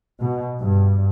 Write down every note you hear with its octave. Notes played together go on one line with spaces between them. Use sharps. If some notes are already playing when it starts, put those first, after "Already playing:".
B2
G2